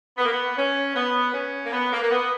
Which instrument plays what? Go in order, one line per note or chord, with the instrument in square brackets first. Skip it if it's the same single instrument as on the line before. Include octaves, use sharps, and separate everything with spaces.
[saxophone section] B3
A#3
B3
C#4
B3
C#4
A#3
B3
A#3
A#3
B3